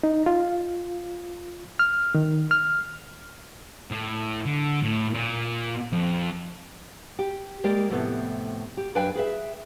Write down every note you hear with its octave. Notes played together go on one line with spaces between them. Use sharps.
D#4
F4
F6
D#3
F6
A2
D3
A2
A#2
F2
G4
G#3 A#3 G4 D5
F2 A2 C3 A3 B3
G4
F#2 D4 B4 F5 G5 G#5
G#4 B4 E5